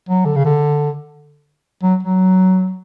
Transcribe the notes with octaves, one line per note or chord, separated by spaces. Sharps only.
F#3
D3
C#3
D3
F#3
F#3